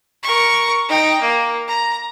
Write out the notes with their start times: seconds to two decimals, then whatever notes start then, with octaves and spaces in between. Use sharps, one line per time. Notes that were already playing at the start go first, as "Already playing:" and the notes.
0.23 A#4 C#6
0.89 D#4 G5
1.21 A#3
1.67 A#5